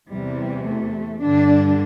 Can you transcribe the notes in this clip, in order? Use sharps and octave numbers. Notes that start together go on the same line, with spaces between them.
E2 C3 E3 G3
A3
G2 D3 D4